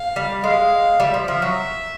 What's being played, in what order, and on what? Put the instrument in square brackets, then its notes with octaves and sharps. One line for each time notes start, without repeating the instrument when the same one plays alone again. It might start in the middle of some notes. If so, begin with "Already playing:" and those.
Already playing: [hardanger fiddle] F5
[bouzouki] G3
[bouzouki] G#3 [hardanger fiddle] F5
[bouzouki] G3 [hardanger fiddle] E5
[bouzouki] F3
[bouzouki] F3 [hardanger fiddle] E5
[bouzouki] F#3